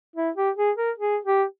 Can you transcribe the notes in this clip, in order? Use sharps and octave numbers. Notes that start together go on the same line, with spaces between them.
E4
G4
G#4
A#4
G#4
G4